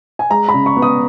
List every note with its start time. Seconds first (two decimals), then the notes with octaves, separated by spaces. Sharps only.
0.19 G#5
0.30 G#3 A#5
0.49 B5
0.54 C#3
0.66 C#6
0.77 B3
0.82 D#6